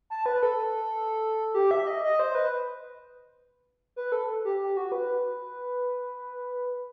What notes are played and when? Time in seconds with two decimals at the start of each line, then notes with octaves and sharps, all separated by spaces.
0.10 A5
0.26 B4
0.43 A4
1.54 G4
1.71 E5
1.87 D#5
2.04 D#5
2.19 C5
2.35 B4
3.96 B4
4.12 A4
4.45 G4
4.60 G4
4.77 F#4
4.92 B4